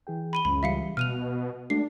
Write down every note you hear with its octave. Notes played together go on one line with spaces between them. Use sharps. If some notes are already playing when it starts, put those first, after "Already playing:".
E3 G#4 G5
B5 D#7 G7
C#2 F#2 B5
E3 G3 E5 F5 C#7
B2 F6 F#6 D#7 F7
G#3 A3 D4 F#4 C7